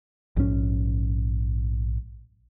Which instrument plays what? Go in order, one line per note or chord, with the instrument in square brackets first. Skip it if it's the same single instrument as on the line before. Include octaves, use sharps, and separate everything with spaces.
[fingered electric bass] A#1 G#2 D#3 C#4